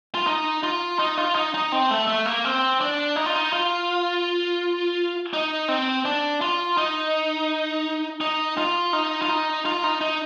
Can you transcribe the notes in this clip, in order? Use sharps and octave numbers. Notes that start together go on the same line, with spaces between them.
F4
D#4
F4
D#4
F4
D#4
D#4
C4
A3
A3
A#3
C4
D4
D#4
F4
D#4
F4
D#4
C4
D4
F4
D#4
D#4
F4
D#4
F4
D#4
F4
D#4
D#4